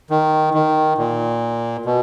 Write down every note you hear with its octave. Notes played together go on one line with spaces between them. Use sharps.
D#3
D#3
A#2
B2